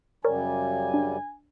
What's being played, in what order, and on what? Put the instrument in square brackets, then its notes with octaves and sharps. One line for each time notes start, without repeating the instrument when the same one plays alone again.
[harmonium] F#2 C#3 G3 [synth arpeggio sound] A#4 C#5 D5 [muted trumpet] G#5
[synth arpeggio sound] D4